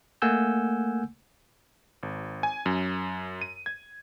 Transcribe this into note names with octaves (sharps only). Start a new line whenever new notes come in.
A3 A#3 F#5 G#5 E6 G6
G#1
G#5
F#2
D#7
G#6